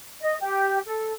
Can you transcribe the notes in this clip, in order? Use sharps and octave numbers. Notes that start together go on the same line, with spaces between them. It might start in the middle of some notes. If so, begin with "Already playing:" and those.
D#5
G4
A4